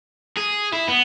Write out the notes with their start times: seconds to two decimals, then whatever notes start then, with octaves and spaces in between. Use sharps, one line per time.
0.37 G#4
0.73 E4
0.88 B3